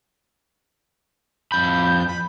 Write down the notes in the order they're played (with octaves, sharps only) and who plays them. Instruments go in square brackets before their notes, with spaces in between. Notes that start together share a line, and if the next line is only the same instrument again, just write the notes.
[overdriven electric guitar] F2 B5 [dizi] G6
[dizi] B5